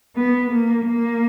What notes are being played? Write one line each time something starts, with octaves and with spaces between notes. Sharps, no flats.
B3
A#3
A#3